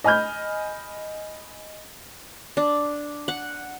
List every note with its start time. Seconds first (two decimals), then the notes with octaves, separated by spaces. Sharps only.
0.04 D#5 G#5 B5 F6 G6
2.57 D4
3.28 F#5